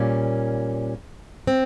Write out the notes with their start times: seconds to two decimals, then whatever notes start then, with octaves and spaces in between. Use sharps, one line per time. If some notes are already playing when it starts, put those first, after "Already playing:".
Already playing: A#2 G3 A#3 C#4
1.47 C4